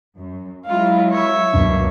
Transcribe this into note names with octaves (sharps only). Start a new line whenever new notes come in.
F#2
F#3 G#3 E4 F4 F5
C#5 E5
C#2 F#2 B2 F#3 A#3 D4